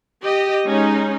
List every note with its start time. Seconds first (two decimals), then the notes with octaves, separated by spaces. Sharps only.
0.24 G4 D#5
0.67 G#3 C#4 D#4